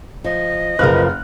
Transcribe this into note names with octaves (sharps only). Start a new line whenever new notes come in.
F3 D#5
F#1 F3 F4 A#4 B4 F6 F#6